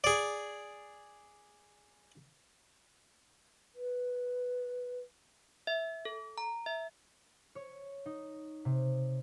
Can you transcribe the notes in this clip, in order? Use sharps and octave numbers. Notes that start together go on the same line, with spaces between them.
G#4 D5
B4
E5
A4
A#5
E5
C#5
D#4
C3